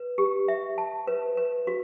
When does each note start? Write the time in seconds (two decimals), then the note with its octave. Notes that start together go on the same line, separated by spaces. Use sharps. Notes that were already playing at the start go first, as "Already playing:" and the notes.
Already playing: B4
0.18 G4
0.48 E5
0.78 A5
1.07 B4
1.37 B4
1.67 F#4